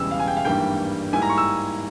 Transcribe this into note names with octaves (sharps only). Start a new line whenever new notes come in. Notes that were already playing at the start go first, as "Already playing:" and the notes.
Already playing: E1 E2 C#3 E3 G3 E6
F5
G#5
G5
F5
G#1 G2 E3 G3 A#3 G5
G#2 G3 A#3 E4 G#5
A#5
C#6
E6